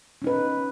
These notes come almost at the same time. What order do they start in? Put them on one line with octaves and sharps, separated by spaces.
C#4 D#4 B4